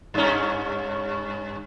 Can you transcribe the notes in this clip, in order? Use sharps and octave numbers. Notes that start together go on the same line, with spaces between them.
G2 C#4